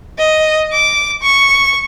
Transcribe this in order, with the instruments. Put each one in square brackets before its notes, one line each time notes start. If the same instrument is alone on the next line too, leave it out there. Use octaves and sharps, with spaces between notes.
[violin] D#5
D6
C#6